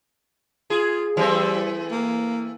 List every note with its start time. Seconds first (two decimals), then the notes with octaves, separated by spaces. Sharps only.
0.70 F4 G#4
1.17 E3 G3 A3 C4
1.91 A#3